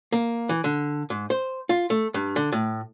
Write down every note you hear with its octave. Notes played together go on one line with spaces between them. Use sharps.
A#3
E3
D3
G#2
C5
F4
A3
G2
D3
A2